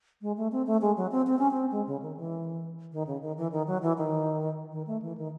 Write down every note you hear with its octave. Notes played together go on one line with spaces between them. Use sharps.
G#3
A3
C4
A3
G#3
F#3
C4
C4
C#4
C4
G#3
C#3
D#3
E3
D#3
C#3
D#3
E3
D#3
F#3
E3
D#3
D#3
A3
E3
D#3